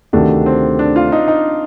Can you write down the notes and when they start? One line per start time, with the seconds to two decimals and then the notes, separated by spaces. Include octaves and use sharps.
0.13 D2 C3 D#3 A3 D4
0.46 C4
0.79 D4
0.96 F4
1.12 D#4
1.28 D#4